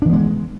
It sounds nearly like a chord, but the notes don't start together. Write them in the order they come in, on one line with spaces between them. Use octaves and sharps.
D4 E3 B3 G#3